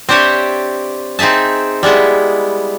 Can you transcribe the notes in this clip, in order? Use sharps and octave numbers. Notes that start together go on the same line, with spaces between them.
C4 D4 G4 C5 C#5 E5
C4 D#4 G#4 E5 A5
G3 G#3 B3 E4